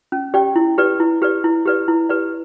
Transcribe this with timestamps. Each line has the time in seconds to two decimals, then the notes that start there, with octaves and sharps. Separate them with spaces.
0.12 C#4
0.34 G4 D5 G5
0.56 E4
0.78 G4 B4 D5
1.00 E4
1.22 G4 B4 D5
1.44 E4
1.66 G4 B4 D5
1.88 E4
2.09 G4 B4 D5